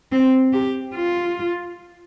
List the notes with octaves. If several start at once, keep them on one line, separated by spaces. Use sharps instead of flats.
C4
G4
F4